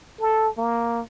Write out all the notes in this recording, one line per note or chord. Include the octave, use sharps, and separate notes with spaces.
A4
A#3